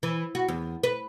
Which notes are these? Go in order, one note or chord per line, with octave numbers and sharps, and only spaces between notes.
E3
F#4
E2
B4